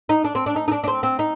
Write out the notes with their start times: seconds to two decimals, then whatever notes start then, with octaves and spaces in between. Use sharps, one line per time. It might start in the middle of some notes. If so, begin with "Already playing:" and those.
0.09 D#4
0.24 D4
0.35 C4
0.46 D4
0.56 D#4
0.68 D#4
0.72 D4
0.84 D4
0.88 C4
1.03 C4
1.19 D#4